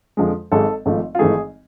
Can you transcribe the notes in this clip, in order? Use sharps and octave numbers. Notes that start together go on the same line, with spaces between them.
F2 D3 F3 G#3
G#1 G#2 G#3 A4
G#1 G#2 F3 A3
F4
G#1 G#2 E3 A3 G#4